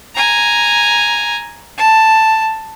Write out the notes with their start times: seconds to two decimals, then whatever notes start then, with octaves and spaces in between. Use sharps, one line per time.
0.15 G#5 A#5
1.78 A5